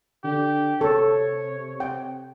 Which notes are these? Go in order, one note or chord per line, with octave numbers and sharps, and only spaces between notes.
D3 G4
C3 A4 C#5
G5